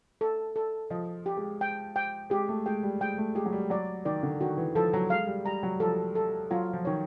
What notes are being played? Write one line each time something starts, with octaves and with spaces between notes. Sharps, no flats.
A4
A4
F3 D#5
G4
G#3
G5
G5
G#3 G4
A3
G#3 G5
G3
G#3 G5
A3
G#3 G4
F#3
G3
F#3 D5
D#3 D5
D3
D#3 F#4
E3
F3 A4
F#3
G#3 F5
G3
G3 A#5
F#3
F3 A4
A4
F#3 F4
F3
D#3 C#5